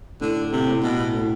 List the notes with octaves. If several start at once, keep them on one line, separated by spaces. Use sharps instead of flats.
A2 D3
C3
A2
B2
A2